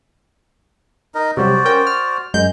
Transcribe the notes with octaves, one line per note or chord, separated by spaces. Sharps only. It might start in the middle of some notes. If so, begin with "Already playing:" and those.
D#4 A#4 D#5
C3 F#3 G3 F#4 C5 D5
C#4 A#4 G5
F6
F#2 G#3 G6